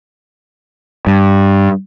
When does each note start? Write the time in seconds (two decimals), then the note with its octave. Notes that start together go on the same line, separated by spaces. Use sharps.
1.07 G2